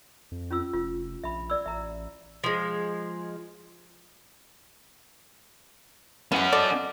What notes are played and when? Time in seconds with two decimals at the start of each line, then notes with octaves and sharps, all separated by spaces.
0.31 F2
0.51 C#4 F4 E6
0.73 F1 F4
1.24 A#1 E5 B5
1.50 D5 E6
1.66 A1 E5 A#5
2.44 F3 G#3
6.32 E3 G#3 C#4 F#5
6.52 A4 D5 D#5